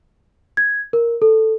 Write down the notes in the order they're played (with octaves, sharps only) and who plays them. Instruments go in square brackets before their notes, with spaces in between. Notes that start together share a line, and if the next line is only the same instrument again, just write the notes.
[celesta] G#6
A#4
A4